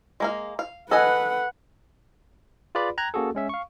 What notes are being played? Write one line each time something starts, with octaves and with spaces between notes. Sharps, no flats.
G#3 A#3 F5
F5
A4 B4 D#5 F#5 G#5
F4 G#4 B4 D5 B5
G5 A#5 F#6 G#6
A#3 C#4 F#4 G#4 A4
G#3 C#4 E5
F5 C#6